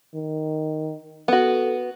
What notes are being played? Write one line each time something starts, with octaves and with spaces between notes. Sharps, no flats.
D#3
B3 F#4 A4